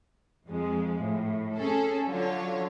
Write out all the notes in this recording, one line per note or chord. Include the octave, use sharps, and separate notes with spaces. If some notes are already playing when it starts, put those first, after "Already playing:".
F2 F3 G#3
A2
C#4 G#4 A4
D3 F#3 F4 C#5